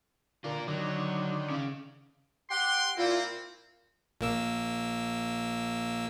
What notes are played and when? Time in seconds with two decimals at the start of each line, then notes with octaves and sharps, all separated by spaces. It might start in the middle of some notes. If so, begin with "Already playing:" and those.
0.44 D3 F4 A#4
0.68 D3 D#3 F#3
1.50 C#3 C#4
2.50 G4 F#5 G5 C6
2.97 A#2 C4 E4 F4
4.21 A#1 A#3 E6